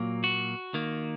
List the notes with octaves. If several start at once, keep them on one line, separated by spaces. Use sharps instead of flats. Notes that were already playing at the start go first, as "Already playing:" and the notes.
Already playing: A#2 F#3 A#3
F#4
D#3 A#3